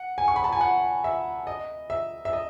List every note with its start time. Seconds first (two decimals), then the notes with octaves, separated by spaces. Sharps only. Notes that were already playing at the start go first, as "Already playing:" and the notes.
Already playing: F#5
0.18 G#5
0.28 C#6
0.36 B5
0.44 A5
0.53 G#5
0.61 F#5
1.04 E5
1.47 D#5
1.90 E5
2.25 E5
2.33 D#5